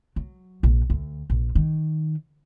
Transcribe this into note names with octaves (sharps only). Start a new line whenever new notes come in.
F#3
A#1
D2
A#1
D#3